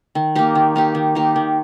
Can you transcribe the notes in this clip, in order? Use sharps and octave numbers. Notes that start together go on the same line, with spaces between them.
D#3
A#3 D#4 G4
D#3
A#3 D#4 G4
D#3
A#3 D#4 G4
D#3